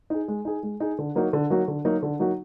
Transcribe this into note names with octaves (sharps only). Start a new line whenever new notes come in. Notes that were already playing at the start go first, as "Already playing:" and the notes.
D#4 G#4
G#3
D#4 G#4
G#3
D#4 G#4
D3
F#3 A#3 D#4 F#4
D3
F#3 A#3 D#4 F#4
D3
F#3 A#3 D#4 F#4
D3
F#3 A#3 D#4 F#4